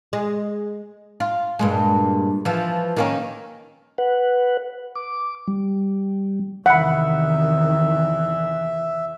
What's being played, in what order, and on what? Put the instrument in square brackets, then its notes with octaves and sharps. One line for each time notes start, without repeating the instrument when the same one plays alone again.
[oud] G#3
F4
G2 A#2 G#3
E3 F3
D#3 A#3 C#4
[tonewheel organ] B4 F#5
D6
G3
[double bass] E2 E3 [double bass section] C3 D#3 [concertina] E5 [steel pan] F#5 B5